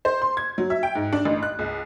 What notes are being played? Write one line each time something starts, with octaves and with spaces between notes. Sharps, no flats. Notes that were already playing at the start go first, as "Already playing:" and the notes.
C5
C6
G#6
F#3
E5
G5
G#2
D4
A1
F#6
C#2